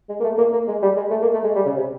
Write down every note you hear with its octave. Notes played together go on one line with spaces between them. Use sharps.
G#3
A#3
A3
A#3
A#3
G#3
G3
G#3
A3
A#3
A3
G#3
G3
C#3
C3